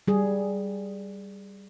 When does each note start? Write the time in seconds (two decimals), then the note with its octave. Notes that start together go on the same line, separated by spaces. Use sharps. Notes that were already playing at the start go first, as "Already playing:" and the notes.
0.08 G3 G#4